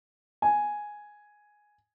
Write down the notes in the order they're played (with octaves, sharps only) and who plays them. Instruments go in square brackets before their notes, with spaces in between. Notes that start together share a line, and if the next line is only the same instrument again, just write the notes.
[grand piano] G#5